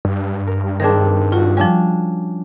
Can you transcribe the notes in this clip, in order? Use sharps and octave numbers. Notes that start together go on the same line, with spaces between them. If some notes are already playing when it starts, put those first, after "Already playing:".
G2
A#4
D#3 C4 D4 G#4 A#4
F4 F#4
F3 G3 C#4 D4